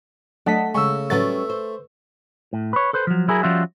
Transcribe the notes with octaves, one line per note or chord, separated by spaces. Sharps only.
F#3 A3 D4 D#5 F#5 A5 B6
C#3 G#3 C#6 E6
A2 F#3 G3 A3 C#4 B4 A6
C5
A2
B4 C#5
A4 B4 C5
F3 F#3
F#3 E4 G#4 A#4
F3 G3 C#4 F4 F#4 E5